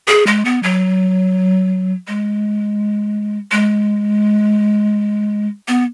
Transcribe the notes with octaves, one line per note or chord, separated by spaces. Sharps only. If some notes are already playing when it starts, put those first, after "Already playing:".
G#4
G#3
B3
F#3
G#3
G#3
B3